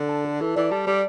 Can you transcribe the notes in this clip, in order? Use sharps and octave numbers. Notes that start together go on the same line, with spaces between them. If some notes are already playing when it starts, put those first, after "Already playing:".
Already playing: D3
A5
A4
E3 A4
E3 D5
G3 A5
G3 D5